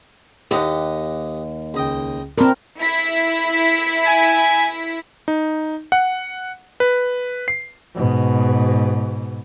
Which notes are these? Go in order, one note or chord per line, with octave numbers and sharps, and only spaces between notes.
D#2 G4 D#5 F#5
C#2 D#5 G5
C4 D4 E4 F4 A#4
E4 B6
G#5
D#4
F#5
B4
C7
G#2 B2